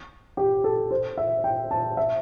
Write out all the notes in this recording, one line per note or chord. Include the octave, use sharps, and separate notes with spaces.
G4
A4
C5
E5
G5
A5
E5